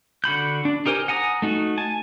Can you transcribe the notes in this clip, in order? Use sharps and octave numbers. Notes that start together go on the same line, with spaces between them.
D3 F#4 B5 G6
D4
D#4 G4 A#4 C5 G#5
F#5 G#5 A#5 D#6
A3 D#4 F#4
G#5 A5